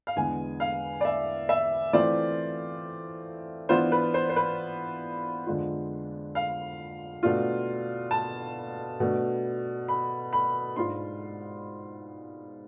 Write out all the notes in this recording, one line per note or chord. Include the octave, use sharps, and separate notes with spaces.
F5
E2 D3 G#3 B3 G#5
F5
D5
E5
E5
E3 A3 C4 F4 D5
E3 B3 D4 F4 C5
B4
C5
C5
B4
F2 D3 G#3 D4 F4
F5
B2 A3 D4 F4
A5
B2 A3 D4
B5
B5
G#2 G#3 D4 F4 C6